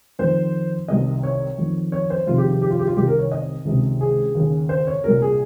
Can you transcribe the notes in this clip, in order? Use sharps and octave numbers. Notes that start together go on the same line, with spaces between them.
F2 D#3 C5
C2 C3 D#3 D#5
C#5
F2 D#3
C#5
C5
F2 C3 D#3 F4
G4
G4
G4
F4
G4
F4
C2 C3 D#3 G4
A#4
C#5
D#5
C#2 C3 D#3
G#4
D#2 C#3
C5
C#5
C2 A#2 A#4
G#4